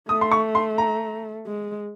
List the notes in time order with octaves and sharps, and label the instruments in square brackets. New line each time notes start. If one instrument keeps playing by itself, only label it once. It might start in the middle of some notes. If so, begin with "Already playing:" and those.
[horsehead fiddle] A3 [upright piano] D#6
[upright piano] C6
C#6
C6
A#5
[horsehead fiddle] G#3